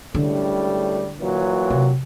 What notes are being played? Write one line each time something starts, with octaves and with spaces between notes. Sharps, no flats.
C#2 A2 D3 G3
A#2 E3 F#3
C3